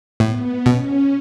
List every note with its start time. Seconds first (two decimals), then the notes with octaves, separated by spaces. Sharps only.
0.20 A2 B3
0.66 B2 C#4